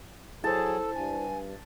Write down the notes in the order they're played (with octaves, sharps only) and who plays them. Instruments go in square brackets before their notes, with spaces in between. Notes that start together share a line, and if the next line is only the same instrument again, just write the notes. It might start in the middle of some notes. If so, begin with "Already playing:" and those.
[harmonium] F#3 G#4 [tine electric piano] E4 C5 [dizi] A4 [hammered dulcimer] A5
[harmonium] G2 [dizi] G#5